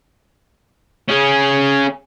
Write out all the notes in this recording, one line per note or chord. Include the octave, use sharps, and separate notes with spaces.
C#4 G#4